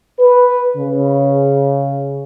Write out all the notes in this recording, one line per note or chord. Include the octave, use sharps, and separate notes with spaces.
B4
C#3